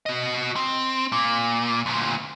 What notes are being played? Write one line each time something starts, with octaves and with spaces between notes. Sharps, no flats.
F#4 D#5
C4
A#2
D2 A#2